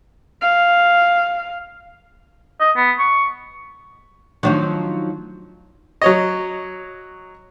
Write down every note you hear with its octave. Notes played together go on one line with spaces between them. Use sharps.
F5
D#5
B3
C#6
D#3 F3 F#3 A3 D4 D#4
F#3 C#5 D#5